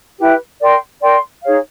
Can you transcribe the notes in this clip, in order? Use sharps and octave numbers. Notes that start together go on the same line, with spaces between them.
E4 G4 B4
A#4 D5 G5 C6
A#4 D5 G5 C6
D#4 G#4 C#5 F5